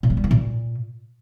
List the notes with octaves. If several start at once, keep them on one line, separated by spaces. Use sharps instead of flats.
A#2
F#3
G3
D#3
A#2